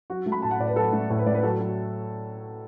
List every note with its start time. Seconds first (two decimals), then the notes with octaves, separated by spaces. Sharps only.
0.10 F#3 F#4
0.26 A3
0.32 B5
0.42 A2 A5
0.51 F#5
0.59 A2 D5
0.68 B4
0.76 F#3 A4
0.93 A3
1.10 A2 A4
1.18 B4
1.26 A3 D5
1.34 B4
1.43 F#3 A4
1.60 F#3